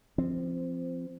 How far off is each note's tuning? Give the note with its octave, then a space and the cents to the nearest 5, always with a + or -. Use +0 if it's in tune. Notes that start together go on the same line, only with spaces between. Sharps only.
F3 -15 C4 +0